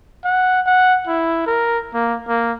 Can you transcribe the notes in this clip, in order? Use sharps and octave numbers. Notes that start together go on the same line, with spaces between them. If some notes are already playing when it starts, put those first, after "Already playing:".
F#5
F#5
E4
A#4
A#3
A#3